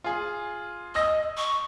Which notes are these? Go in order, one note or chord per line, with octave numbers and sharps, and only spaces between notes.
F4 G#4
D#5 D#6 E6 A#6
C#6